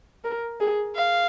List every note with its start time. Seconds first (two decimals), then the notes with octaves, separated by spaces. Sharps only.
0.24 A#4
0.61 G#4
0.96 F5